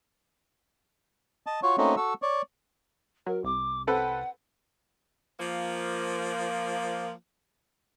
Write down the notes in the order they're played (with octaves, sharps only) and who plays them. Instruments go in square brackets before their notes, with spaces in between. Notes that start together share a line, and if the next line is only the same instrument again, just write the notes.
[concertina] D#5 A5
F4 F#4 C#5
A3 A#3 C4 C#4 D#4 F#4
F#4 A4 E6
C#5 D5
[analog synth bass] F#3 [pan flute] A#4
[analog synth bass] C2 [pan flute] D6
[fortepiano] C4 A4 B4 [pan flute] F#5
[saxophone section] F3 A#3